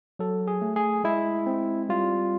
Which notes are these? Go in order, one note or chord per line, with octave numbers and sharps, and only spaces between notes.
F#3 A4
G#4
A3
G#4
G#3 E4
C4
G3 F4